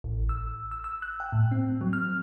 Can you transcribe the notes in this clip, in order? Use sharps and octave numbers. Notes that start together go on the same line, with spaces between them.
A1
E6
E6
E6
F#6
G5
A2
C4
F#3
F6